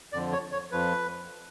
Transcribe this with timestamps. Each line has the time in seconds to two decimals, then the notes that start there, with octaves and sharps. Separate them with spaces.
0.12 F2 D3 F3 D5
0.32 C#5
0.52 C#5
0.72 F2 F3 B4